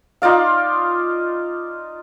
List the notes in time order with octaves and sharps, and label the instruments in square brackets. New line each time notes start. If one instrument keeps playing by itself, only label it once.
[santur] D#4 F4 D5 F5